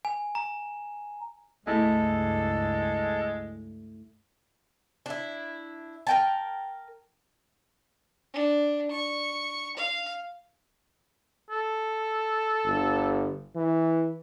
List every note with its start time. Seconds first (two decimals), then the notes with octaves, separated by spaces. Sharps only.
0.05 G#5
0.35 A#5
1.67 C#2 G2 G#3 A3 E4 A4
5.06 D4 E4
6.07 A#4 G5 A5
8.34 D4
8.91 C#6
9.77 F5
11.51 A4
12.66 G1
13.56 E3